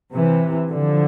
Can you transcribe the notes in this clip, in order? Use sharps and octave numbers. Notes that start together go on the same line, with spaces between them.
C3 E3
D3 F3